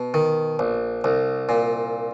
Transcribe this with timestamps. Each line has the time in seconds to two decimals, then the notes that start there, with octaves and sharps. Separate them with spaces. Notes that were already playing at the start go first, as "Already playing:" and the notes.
Already playing: B2
0.14 D#3
0.59 A#1
1.04 C2
1.49 A#2